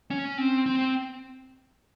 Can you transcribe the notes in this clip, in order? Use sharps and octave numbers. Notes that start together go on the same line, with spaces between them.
C#4
C4
C4